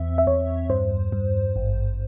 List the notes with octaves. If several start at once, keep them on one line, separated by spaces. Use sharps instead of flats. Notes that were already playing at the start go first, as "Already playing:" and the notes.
Already playing: E2 C4 E5
E5
E2 C#5
G2 C5
G2
G#1